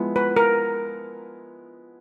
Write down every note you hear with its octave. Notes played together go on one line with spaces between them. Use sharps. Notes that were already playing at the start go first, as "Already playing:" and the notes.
Already playing: F3 G#3 B3 E4
B4
A#4